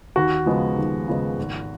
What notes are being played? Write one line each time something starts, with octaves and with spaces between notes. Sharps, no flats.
D#2 F#4
C#3 F3 G#3 B3
D#2
C#3 F3 G#3 B3
G#1